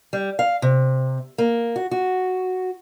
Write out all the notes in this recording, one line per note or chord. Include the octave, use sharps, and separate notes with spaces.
G3
F5
C3
A#3
F#4
F#4